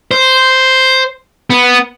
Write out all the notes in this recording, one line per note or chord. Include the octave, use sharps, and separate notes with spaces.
C5
B3